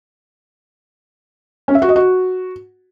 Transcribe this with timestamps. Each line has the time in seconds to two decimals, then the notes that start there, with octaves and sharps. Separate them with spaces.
1.68 C#4
1.75 E5
1.82 F#4
1.89 D#5
1.96 F#4